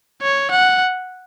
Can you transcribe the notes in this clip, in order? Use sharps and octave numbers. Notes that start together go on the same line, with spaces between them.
C#5
F#5